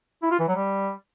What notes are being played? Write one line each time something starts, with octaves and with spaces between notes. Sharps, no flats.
E4
F4
E3
F#3
G3